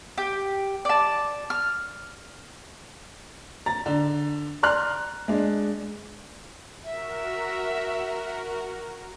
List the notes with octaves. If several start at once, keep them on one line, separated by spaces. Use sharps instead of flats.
G4
D5 A5
F6
A#5 A6
D3
D5 A#5 C6 F6 F#6
G#3 D4
F#4 A#4 E5